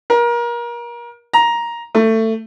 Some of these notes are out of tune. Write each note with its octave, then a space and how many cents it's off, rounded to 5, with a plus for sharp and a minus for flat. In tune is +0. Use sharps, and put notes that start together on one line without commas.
A#4 +30
A#5 +10
A3 +20